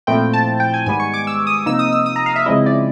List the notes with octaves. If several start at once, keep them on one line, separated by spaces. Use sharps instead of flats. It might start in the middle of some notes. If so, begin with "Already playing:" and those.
A#2 F3 A3 C4 E4 G5
A5
G5
G#5
G#2 D#3 G3 B3 G#5
C#6
D6
E6
D#6
C3 F3 A#3 D#4 E6
D#6
E6
D#6
A#5
F5
E5
C#3 F3 G#3 C4 E4 D#5
D5